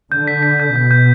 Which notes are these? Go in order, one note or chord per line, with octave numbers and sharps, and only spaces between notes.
D3 G6
B6
B6
G6
B2 G6
G6